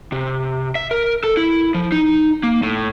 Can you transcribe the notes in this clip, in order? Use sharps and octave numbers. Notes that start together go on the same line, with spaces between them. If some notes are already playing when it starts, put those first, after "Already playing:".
C3
E5
A#4
A4
E4
F3
D#4
A#3
A2